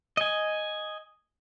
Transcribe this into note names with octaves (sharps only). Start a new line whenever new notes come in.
D#5 G#5